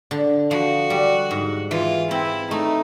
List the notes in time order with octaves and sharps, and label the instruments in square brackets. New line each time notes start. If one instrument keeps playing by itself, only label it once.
[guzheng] D3
[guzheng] F3 [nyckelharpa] F#4
[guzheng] G3
G#2
[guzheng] E3 [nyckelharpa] F4
[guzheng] C4 [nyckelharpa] E4
[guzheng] A3 [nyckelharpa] D#4